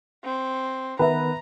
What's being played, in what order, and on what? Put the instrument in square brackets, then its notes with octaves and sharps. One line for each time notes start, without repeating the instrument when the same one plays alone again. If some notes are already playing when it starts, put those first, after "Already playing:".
[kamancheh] C4
[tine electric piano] D#3 B3 [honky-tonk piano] B4 E5 [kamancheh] A#5